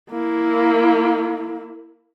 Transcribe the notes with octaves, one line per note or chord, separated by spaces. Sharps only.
A#3 E4